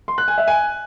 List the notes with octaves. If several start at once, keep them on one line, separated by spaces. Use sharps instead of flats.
C6
F#6
G#5
E5
G#5